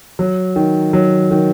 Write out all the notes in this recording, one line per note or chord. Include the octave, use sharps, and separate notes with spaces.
F#3
D#3
F#3
D#3